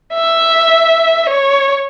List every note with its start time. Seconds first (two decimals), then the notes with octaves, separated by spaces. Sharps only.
0.14 E5
1.29 C#5